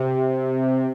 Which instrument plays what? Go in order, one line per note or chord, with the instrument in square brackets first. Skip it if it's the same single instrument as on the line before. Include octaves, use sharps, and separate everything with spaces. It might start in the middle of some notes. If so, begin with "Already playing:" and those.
Already playing: [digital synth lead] C3